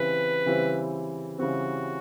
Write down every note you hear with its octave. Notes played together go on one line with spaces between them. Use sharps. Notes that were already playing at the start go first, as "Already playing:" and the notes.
Already playing: C#3 E3 G3 C4 B4
C#3 E3 G3 C4
C#3 E3 G3 C4 F#4